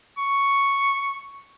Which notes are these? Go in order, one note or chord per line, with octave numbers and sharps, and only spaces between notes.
C#6